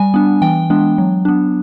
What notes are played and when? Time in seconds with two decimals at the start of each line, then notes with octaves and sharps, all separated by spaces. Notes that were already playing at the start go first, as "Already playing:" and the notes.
Already playing: G3 G#5
0.14 B3 D4
0.42 E3 G5
0.70 G#3 B3 D4
0.98 F#3
1.25 B3 D4